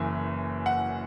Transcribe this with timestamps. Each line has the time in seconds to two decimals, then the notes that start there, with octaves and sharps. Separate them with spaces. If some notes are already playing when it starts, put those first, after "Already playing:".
Already playing: F#1 F#2 E3 G#5
0.66 F#5